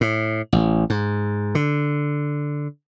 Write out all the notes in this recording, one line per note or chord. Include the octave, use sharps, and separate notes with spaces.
A2
A1
G#2
D3